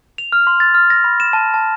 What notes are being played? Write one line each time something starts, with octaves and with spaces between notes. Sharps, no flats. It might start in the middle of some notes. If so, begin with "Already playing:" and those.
F7
F6
C6
A6
F6
A#6
B5
E7
A5
A5